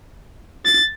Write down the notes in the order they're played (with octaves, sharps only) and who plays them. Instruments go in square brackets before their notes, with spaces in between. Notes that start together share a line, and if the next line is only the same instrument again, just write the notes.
[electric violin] A6